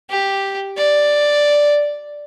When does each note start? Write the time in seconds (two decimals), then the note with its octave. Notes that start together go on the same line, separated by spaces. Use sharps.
0.10 G4
0.77 D5